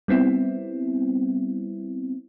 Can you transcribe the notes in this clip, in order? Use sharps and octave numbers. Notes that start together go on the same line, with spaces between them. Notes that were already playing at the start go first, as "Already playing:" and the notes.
G3 B3 C4 E4